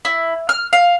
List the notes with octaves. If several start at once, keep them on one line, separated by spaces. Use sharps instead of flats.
E4
F6
F5